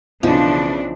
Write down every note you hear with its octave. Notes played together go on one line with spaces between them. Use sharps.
B1 C#3 E3 F3 D4